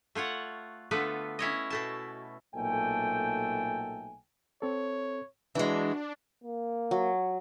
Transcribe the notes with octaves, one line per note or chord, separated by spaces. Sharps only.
A3 F4 C#5 F#5
D3 A3 B3 F4 B4
C#4 E4 C#5 D#5
B2 A3 A5
B1 A#2 A3 A4 G5 G#5
C4 A4 C#5
E3 G#3 D4 F#4 E5
A#3
F#3